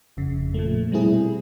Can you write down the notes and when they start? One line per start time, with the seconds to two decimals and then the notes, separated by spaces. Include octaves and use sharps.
0.17 G1 F2 C#3
0.54 A#2 F3 A3
0.91 B2 G3 C4 E4 G#4